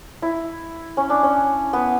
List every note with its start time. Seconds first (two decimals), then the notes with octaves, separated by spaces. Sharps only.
0.22 E4
0.97 C#4
1.10 D4
1.23 C#4
1.73 B3